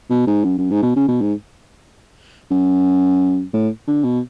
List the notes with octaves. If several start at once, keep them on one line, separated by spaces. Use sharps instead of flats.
B2
G#2
F#2
F#2
G#2
B2
C#3
B2
G#2
F#2
A2
D3
B2